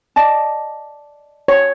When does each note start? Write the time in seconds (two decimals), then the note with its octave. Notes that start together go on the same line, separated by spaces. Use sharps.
0.16 D5 D#5 A5
1.48 C#5